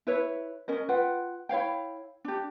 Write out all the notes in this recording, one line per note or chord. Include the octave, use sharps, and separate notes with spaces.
E4 B4 C#5
C#4 A#4 D#5
F4 B4 F#5 G5
E4 C#5 F5 G5
D4 G4